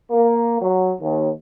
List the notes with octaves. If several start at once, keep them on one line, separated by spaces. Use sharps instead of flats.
A#3
F#3
D#2